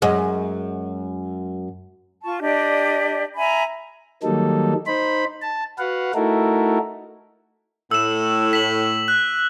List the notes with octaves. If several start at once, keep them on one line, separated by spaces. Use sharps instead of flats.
F#2 G#3
F4 A5 C#6
D4 G4 D5 D#5
E5 G#5 A#5 B5
D#3 F#3 G3 A#3 D#4 A4
D#4 C5 B5
A5
F#4 B4 F5 F#5
A3 D#4 E4 F#4 A4 A#4
A2 E6 E7
B6 F#7
F#6